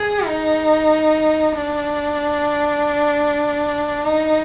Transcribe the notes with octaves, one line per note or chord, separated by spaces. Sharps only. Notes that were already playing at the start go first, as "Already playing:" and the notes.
Already playing: G#4
D#4
D4
D#4